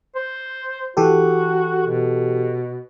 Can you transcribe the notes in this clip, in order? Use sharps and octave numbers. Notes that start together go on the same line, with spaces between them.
C5
E3 F#4 G4 A4
B2